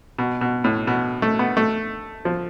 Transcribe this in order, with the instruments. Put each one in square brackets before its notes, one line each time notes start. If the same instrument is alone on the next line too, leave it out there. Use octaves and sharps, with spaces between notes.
[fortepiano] B2
B2
A2
B2
A3
B3
A3
F3